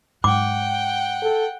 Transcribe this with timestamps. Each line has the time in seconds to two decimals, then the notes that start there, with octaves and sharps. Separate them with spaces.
0.24 G#2 F#5 G5 D6
1.22 A4